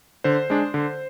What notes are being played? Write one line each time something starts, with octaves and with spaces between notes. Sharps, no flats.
D3 C5
G#3 D4
D3